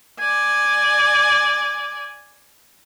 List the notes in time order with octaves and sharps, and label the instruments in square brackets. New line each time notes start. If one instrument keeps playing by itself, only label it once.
[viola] D5 G#5